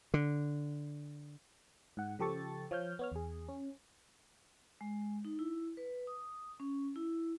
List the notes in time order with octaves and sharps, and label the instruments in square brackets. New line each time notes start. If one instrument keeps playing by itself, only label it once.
[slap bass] D3
[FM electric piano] G#2 F#5
C#3 F3 G4 A4 C#6 A6
F3 C#5 F6 G6
B3 C#5 F6
E2 G#4
C#4
[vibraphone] G#3
D#4
E4
B4
D#6
C#4
E4